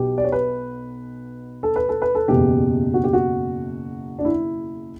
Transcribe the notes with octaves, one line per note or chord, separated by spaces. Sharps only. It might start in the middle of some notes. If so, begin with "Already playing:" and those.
Already playing: B1 B2 G4
D5
C#5
B4
A4
B4
A4
B4
A4
F#1 E2 B2 G4
F#4
G4
F#4
D4
E4